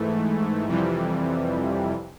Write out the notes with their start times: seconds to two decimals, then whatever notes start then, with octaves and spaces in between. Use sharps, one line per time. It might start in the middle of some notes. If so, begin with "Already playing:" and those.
Already playing: G#2 E3 A3
0.67 F2 C3 E3 G3